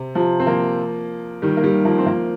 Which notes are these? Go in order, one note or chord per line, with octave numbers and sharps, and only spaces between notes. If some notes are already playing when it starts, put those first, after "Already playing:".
Already playing: C3
C3 F3
C4
F3 A#3
D#3 G3
A#3
D#3 G3
F3 A#3
C4
F3 A#3